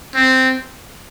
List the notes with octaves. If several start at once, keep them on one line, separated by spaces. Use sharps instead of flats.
C4